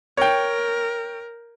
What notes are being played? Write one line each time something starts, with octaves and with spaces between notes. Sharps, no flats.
A#4 C#5 G5